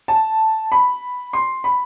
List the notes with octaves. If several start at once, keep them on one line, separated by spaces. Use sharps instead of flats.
A5
B5
C6
B5